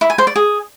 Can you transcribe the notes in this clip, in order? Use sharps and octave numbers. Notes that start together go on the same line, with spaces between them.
E4
G#5
C5
D5
G#4